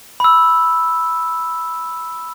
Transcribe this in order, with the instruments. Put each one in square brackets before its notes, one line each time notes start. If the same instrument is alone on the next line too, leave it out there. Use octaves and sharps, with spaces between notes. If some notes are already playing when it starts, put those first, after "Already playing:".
[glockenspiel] B5 E6